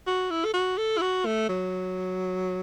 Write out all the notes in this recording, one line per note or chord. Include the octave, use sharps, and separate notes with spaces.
F#4
E4
A4
F#4
A4
E4
F#4
A3
F#3